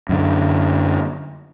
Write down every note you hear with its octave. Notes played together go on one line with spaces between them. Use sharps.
F#2 D3